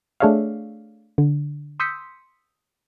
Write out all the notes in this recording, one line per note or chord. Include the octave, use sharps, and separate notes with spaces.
A3 D4 G#4 C#5 E5 F5
D3
C6 D#6 E6 G6 B6 C#7